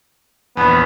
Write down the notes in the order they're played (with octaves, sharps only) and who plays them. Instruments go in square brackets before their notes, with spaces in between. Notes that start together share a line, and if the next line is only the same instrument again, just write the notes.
[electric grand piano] A#1 E2 [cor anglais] B3